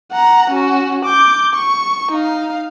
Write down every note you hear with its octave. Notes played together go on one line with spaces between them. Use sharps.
F#5 A#5
C#4 F#4
D6 G6
C#6
D#4 F5